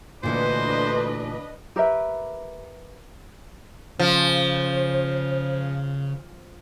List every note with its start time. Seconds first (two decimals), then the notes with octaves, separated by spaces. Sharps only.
0.23 D2 A#2 D3 E3 D4 B4 C5 D#5
1.76 G4 A#4 B4 E5
3.99 C#3 F3 C5